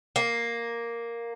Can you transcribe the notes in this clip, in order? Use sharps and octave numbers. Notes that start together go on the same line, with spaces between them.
A#3